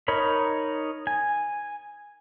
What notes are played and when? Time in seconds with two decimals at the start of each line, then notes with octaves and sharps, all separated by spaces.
0.08 D#4 A#4 C#5 B5
1.07 G#5